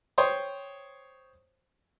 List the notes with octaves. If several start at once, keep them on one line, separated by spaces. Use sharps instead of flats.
C5 C#5 G5 C6 D#6